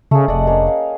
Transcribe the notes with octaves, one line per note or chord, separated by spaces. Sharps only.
C#3 A3 G#4
F1 D5 D#5 F#5
A#3 C#4 G#4
F5